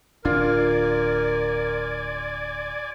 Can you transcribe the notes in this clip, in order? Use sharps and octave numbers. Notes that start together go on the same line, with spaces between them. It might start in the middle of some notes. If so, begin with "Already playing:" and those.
D1 D4 F4 A#4 D5 G#5